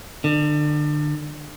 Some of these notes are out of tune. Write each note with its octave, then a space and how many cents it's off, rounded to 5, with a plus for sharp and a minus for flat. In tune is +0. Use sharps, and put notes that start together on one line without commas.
D3 +30